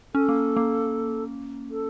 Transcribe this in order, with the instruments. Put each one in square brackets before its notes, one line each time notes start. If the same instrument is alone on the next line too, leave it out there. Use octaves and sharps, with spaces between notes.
[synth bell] C#4 [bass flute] A4
[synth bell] A#3
A#3
[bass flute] A4